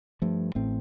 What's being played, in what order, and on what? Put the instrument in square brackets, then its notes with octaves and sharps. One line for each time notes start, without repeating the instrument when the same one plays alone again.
[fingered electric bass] G2 F3 A3
A1 A2 A3 C4